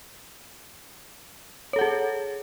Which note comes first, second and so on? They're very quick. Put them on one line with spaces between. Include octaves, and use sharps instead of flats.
C#5 A4 F#5 G#4